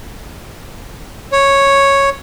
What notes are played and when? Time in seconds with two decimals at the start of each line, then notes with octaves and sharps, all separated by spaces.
1.32 C#5